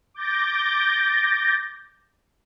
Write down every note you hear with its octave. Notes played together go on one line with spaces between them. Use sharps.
D6 G6 A6 A#6